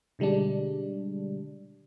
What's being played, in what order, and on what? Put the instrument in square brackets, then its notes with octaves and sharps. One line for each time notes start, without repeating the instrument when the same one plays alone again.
[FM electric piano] B2 D3 G3 G#3 D4